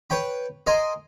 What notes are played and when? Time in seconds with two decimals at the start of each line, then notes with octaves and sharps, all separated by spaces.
0.10 B4 C#5 G5 B5
0.67 A#4 D#5 G#5 C6